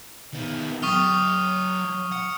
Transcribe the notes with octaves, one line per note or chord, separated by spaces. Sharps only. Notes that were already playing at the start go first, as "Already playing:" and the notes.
D#3 B3
F#3 G5 C#6 D#6 F6
F#5